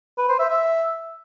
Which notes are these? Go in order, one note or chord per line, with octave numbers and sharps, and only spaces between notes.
B4
C5
E5
E5